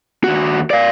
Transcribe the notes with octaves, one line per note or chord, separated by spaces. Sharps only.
D#2 F#4
D5 F5